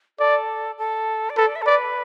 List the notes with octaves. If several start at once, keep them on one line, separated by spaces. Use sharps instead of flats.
A4 D5
A4
D5
A4 B4
D5
E5
A4
B4 D5